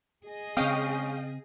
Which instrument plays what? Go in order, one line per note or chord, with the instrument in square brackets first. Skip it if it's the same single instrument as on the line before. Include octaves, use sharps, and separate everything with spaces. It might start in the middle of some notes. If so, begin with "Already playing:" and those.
[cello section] G#4 D#5
[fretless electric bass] C#3 C4 [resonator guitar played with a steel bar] G#3 C#4 [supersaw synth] F5 G5 D#6